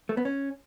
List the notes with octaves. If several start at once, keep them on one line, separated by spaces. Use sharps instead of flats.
A3
B3
C#4